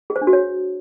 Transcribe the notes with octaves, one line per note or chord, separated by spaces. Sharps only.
G#4
C5
D4
F#4
C#5